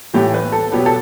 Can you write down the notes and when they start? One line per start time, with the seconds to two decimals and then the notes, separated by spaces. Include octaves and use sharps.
0.14 A2 E3 A3 G4
0.34 B4
0.52 A4
0.72 B2 F#3 B3 G4
0.86 A4